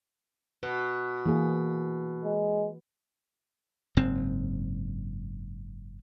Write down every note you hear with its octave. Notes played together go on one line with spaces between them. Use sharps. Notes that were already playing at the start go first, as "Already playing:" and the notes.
B2 B4
E3 A#3 G#4
G#3
F#1 G#2 C4